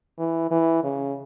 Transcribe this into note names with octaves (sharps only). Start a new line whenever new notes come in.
E3
E3
C#3